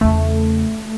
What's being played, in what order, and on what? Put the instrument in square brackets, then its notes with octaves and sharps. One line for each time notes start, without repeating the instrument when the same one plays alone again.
[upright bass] E2 C#3 [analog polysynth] A3